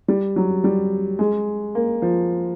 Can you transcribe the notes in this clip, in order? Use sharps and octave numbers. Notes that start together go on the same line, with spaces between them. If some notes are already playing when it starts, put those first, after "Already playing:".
G3
F#3
G3
G#3
A#3
F3